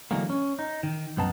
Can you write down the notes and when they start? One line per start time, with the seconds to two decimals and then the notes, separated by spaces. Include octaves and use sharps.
0.11 D3 E3 F#3 G#3 A#3
0.30 C#4
0.59 D#4
0.83 D#3
1.17 C2 F#2 B3 D#4 A5